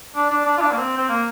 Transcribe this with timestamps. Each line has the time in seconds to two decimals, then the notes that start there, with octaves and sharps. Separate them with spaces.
0.15 D4
0.30 D4
0.45 D4
0.57 F4
0.61 D4
0.71 A#3
0.77 C4
0.97 C4
1.09 A#3